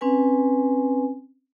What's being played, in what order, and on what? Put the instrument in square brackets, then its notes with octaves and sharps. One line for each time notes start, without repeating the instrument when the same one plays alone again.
[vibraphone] C4 C#4 B4 G#5